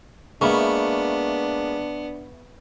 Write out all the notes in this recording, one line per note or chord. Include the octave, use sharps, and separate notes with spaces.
G#3 A#3 B3 D4 E5 B5 C#6